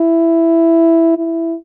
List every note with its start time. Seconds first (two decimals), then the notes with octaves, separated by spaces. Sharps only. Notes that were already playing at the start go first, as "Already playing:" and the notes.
Already playing: E4
1.17 E4